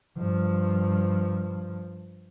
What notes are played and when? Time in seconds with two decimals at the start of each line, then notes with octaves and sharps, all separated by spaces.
0.18 G2 F3